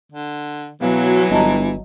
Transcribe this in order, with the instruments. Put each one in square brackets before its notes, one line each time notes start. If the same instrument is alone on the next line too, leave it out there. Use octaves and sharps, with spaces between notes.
[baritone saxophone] D3
[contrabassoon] B2 [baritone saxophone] E3 [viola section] F#3 [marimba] F5
[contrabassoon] G1 [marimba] D#5 A5 A#5